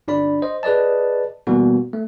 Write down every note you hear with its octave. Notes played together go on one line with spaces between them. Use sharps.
G1 D4 D5 B5
C5 D#5
G#4 B4 D5 D#5 A5
B2 E3 G3 A#3 B3 F#4
A3